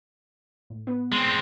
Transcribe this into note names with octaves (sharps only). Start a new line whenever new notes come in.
A2
B3
G#3 C4